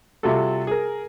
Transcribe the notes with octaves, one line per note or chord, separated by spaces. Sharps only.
C3 G3 F4 F#4 A4
G#4 A#4